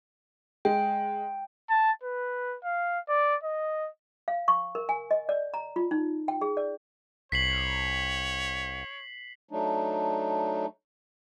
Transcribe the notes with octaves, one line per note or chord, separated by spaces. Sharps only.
G#3 G5
A5
B4
F5
D5
D#5
F5
C#6
A#4
G#5
D#5
D5
A#5
F4
D#4
G5
G#4
D5
C2 C#5 B6 C7 F#7
F#3 A3 D4 D#4